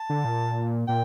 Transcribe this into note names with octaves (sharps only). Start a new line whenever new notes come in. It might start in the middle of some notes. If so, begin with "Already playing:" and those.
Already playing: A5
D3
A#2
A#2 G5